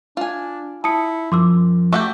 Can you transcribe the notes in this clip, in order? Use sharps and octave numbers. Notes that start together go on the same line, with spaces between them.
D4 F4 G#5
E4 A5 D#6 C#7
F#2 F3 C6 D6 E6
A3 F#4 G4 C#6 D6 E6